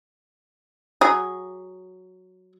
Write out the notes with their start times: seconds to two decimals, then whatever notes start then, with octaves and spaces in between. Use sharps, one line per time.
1.01 F#3 G#4